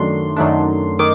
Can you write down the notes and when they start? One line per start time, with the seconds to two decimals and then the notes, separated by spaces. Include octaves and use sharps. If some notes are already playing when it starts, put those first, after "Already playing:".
Already playing: F#2 D#3 F#3 A3 D4 C6
0.36 F#2 D#3 F#3 A3 D4
0.99 D#3 D6